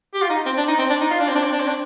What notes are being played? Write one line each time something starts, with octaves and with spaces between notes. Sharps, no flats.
G4
F4
D#4
C4
D4
D#4
C4
D4
D#4
F4
D4
C4
D4
C4
D4
C4
D4